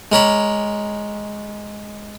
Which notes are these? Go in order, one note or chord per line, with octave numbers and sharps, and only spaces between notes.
G#3 A#4 C#5 B5